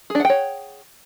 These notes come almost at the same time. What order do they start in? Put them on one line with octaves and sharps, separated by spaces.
G#4 D4 F#5 G5 C#5